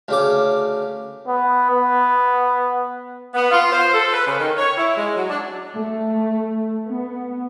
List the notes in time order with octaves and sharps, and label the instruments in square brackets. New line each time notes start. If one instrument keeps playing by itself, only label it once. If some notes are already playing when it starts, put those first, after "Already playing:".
[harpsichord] D2 C#3 D6
[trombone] B3
B3
[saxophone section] B3
F4
C5
A4
B4
C#3
D#3
C#5
E4
G#3
F#3
D4
[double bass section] A3
B3